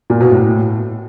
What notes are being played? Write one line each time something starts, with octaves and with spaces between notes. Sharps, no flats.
A#2
B2
A2